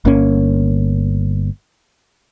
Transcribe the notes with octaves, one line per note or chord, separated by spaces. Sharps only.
G1 A#3 C#4